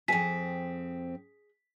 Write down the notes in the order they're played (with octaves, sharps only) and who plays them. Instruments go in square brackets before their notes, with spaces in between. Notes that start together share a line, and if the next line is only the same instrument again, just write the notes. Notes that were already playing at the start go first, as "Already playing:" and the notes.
[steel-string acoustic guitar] F2 C4 [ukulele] G#4 [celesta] B6